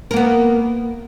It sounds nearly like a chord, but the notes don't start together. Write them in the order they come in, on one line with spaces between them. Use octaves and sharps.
A#4 A#3 B3